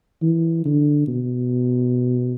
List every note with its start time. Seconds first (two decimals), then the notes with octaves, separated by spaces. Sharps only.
0.22 E3
0.65 D3
1.08 B2